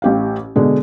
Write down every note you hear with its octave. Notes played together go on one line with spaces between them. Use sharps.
A1 G4 F5
B2 D3 G#3